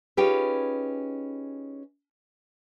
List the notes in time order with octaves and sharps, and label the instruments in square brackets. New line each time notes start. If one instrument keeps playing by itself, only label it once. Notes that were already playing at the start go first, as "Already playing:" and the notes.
[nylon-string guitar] C#4 D#4 F4 G4 G#4 B4